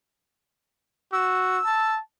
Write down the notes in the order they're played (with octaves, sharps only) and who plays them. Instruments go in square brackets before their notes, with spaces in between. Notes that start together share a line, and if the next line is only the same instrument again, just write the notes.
[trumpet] F#4 [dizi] E6
[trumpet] A5